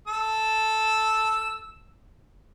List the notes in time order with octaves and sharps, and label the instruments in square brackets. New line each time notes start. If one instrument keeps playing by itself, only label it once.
[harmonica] A4 E6